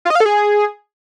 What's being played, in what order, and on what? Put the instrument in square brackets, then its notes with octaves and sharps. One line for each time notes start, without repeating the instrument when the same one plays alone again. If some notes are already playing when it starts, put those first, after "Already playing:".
[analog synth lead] F4
D#5
F5
A4
G#4